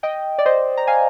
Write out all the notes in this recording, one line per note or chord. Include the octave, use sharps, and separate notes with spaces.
D#5 G5
D5
C5 D#5
A#5
F5 G#5